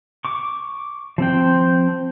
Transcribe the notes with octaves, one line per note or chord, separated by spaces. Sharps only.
C#6 D6
F3 C4 G5